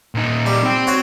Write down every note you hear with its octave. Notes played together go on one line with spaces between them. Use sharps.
A#2 D#4
G3
C4 G5
F#4 C#5